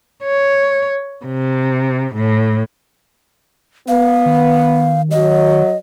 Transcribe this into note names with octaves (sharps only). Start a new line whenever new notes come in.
C#5
C3
A2
B3 F5
D#3
F#3 D#5